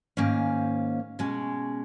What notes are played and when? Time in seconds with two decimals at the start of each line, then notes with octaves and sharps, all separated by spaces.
0.17 G#2 D#3 A#3 C#4 F5
1.19 B2 G#3 C#4